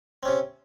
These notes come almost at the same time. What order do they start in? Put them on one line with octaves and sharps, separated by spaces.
C4 C#4 C3